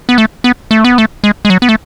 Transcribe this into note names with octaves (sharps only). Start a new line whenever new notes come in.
B3
A3
B3
A3
B3
A3
G#3
G#3
F#3
B3
A3